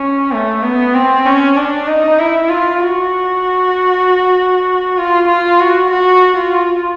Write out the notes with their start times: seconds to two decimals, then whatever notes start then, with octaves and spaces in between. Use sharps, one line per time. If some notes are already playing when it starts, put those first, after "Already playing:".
Already playing: C#4
0.32 A3
0.63 B3
0.95 C4
1.26 C#4
1.57 D4
1.88 D#4
2.19 E4
2.49 F4
2.80 F#4
4.98 F4
5.28 F4
5.60 F#4
5.91 F#4
6.37 F4